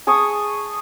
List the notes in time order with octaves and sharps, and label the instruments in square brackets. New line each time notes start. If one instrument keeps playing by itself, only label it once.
[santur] G#4 A5 C#6 D#6